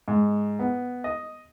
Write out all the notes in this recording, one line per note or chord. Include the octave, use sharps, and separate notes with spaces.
G#2
B3
D#5